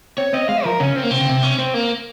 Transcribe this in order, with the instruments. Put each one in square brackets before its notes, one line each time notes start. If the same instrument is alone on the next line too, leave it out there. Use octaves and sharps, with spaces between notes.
[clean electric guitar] C4 [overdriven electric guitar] C#5
[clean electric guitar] C4 [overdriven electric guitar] D#5
[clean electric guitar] G#3 [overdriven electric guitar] F5
[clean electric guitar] F3 [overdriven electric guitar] A#4
[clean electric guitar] C#3 [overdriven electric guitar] C#4
[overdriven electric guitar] C4
A#3
[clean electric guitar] C3 [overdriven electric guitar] C4
[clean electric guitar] C#3
C3
[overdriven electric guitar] C#4
C4
A#3